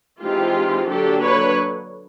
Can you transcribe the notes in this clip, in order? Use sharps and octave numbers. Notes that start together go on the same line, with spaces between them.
E3 G#3 C4 D#4 F4 G4
D3 F#3 A#3 D4 G4 A4
B4 C#5